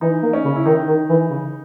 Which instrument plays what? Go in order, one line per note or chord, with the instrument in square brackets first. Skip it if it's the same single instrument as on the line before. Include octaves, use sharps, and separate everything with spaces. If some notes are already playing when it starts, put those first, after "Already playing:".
[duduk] E3 [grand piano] D#4
[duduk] A#3
[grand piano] C#4
[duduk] C#3
[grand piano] E4
[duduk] D#3 [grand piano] D#4
[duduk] D#3
E3
C#3